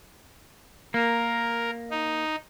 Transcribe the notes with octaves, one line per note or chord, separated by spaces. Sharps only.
A#3 A#4
D#4